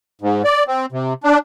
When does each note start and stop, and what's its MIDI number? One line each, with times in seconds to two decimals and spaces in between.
0.21 0.42 44
0.44 0.63 74
0.67 0.86 60
0.92 1.14 48
1.24 1.38 62